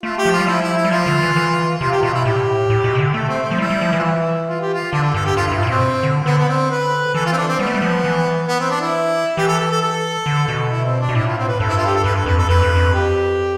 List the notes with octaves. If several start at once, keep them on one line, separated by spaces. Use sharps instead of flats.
A3 F4
G4
F3
F4
G3
F3 E4
E4
E4
G3
F3 F4
D3
E3
E3
C3 F4
G4
B2 F4
E4
A2 G4
A2
B2
C3
D3
A3 A4
C4
C4
F3
G3 E4
G3
F3
E3
F4
E4
F4
G4
F4
D3 D4
A4
G2 A4
G4
G2 F4
G2 E4
A2 F4
B2 C4
D3
D3 B3
B3
C4
B4
E3 A4
F4
C4
D4
C4
G3 B3
A3
G3
F3
E3
B3
C4
D4
E4
E3 G4
A4
A4
A4
A4
D3
B2
E4
C4
D4
B2
A2 E4
F4
C4
B4
G2 A4
E4
F4
G4
A4
G2 B4
A4
F2 B4
A4
F2 B4
G2
F2
G4